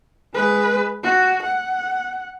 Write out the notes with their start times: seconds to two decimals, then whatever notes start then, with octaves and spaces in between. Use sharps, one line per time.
0.34 G#3 B4
1.03 F#4
1.43 F#5